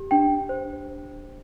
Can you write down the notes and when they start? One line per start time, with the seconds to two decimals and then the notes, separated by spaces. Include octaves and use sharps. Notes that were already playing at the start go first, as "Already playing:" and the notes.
Already playing: G4
0.11 D4 G5
0.49 C5